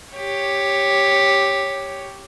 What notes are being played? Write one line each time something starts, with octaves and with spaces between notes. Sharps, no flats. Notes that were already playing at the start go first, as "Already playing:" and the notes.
G4 C#5